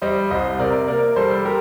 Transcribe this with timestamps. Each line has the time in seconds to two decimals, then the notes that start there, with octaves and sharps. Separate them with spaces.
0.02 G3 C5 D#5
0.30 C2 C5 D#5
0.59 C3 A#4 D5
0.88 A#3 A#4 D5
1.16 G3 A4 C5
1.45 G4 A#4